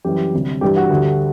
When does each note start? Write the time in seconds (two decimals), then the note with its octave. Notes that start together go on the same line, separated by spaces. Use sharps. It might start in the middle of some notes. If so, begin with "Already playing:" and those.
0.05 F#2 E3 G3 G4
0.34 D2 C3 G3
0.61 G2 E3 G3 G4
0.76 F#4
0.90 D2 D3 G3